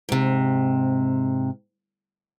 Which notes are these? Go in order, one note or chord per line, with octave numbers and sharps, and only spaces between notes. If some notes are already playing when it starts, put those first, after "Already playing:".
G#2 C3